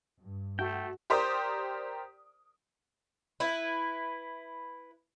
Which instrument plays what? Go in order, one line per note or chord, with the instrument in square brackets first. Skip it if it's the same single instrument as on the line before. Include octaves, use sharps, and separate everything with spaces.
[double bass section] G2
[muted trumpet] A3 [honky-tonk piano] F#4 [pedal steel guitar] G5
[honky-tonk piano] G4 A#4 C5 D5 D#6
[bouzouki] E4 B4